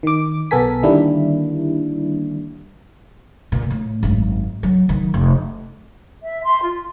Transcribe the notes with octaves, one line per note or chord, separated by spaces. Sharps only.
D#3 D6
B1 B3 A4 A#4 G#5 B6
D3 D#3 G3 A#3 D4 E4
A#2
A2
G#1 F#2
F#3
D#3 F#3
F1
E5
C6
F4